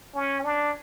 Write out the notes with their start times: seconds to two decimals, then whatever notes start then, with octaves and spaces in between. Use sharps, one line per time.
0.15 C#4
0.44 D4